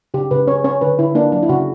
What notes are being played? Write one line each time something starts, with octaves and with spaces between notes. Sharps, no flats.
C#3 G4
C#3 B4
C#4 C#5
C#4 C#5
D3 B4
D3 E4
A#3 D4
F#3 D4
E4
C#3 F#4